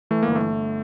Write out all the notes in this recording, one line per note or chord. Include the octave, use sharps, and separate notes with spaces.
E3 A3
G1 A#3
A3
G1